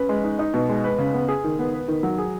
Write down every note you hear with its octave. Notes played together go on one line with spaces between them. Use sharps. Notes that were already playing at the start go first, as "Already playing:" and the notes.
Already playing: C#4 B4
G#3
D#4
D#4
B2
G#3
B4
C#3
B3
G#4
D#3
B3
B4
D#3
F#3
G#4